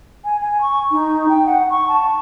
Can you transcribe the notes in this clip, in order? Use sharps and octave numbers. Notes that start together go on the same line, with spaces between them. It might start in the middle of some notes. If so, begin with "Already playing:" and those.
G#5
G#5
C#6
D#4
G5
F#5
C#6
A5